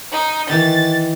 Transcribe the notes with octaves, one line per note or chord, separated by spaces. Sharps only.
D#4
D#3 E3 A6